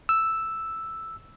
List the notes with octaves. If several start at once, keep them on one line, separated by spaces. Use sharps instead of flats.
E6